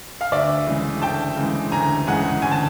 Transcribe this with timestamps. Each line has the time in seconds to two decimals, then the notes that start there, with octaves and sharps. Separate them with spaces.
0.21 F5
0.32 D2 D5 E5
0.67 C#3 E3 G#3
1.02 D2 G5 A5
1.37 C#3 E3 G#3
1.72 D2 G#5 A#5
2.07 C#3 E3 G#3 F#5 G#5
2.42 D2 G#5
2.51 A5